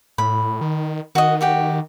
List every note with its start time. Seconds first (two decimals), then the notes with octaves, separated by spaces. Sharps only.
0.18 A2 B5
0.61 D#3
1.15 D#3 F#4 D#5
1.41 F#4 G4 G5